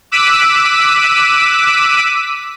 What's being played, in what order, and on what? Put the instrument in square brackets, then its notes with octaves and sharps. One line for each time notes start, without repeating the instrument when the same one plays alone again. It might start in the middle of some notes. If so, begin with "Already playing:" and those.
[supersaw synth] D6 E6 F#6 B6 D#7